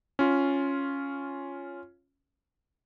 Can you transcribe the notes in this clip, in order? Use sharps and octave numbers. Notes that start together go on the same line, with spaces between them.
C#4 F4